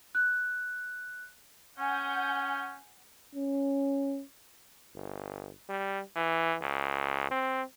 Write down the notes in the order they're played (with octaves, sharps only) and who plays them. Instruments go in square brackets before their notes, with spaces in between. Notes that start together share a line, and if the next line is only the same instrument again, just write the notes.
[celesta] F#6
[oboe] C#4 [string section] F#5 G#5 G6
[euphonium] C#4
[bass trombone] G1
G3
E3
C#2
C4